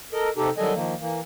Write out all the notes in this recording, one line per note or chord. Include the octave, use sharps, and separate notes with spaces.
A4 A#4 D#5
C3 D#4 G4 A4
D#3 F#3 G3 A4 D#5 G#5
D#3 F3 A#3
E3 A#3